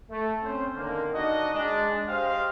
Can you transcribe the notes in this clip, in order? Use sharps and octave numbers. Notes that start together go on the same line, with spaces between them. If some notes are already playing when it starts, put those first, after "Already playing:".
A3
C4 C#4 C5
D3 D#3 A#3
D4 D#4 F#4 D#5
G#3 D4
G4 C5 D#5 F5